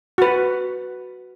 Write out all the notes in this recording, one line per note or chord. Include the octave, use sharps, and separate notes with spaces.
F#4 B4